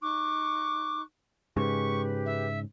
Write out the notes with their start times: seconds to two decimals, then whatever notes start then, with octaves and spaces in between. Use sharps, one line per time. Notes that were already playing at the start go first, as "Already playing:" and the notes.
0.02 D#4 C#6 D6 F#6
1.57 G#2 C#3 G#3 G4 B4 C#6
2.26 E5